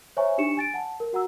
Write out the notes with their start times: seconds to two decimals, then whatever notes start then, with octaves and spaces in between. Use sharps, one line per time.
0.17 C5 C#5 E5 G#5 A#5 C#6
0.38 D4 D#4 G4 C#6 C#7 E7
0.57 G#5 A6 D7
0.74 F#5 A5
1.00 A#4
1.13 F#4 F#5 A#5 E6